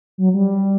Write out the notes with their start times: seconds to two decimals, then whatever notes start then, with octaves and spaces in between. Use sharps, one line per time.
0.18 F#3
0.34 G3